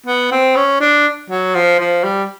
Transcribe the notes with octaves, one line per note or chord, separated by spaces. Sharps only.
B3
C4
C#4
D4
F#3
F3
F3
G3